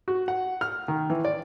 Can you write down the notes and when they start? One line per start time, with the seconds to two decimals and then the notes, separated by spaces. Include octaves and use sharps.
0.08 F#4
0.28 F#5
0.61 F6
0.88 D#3
1.10 E3
1.25 D5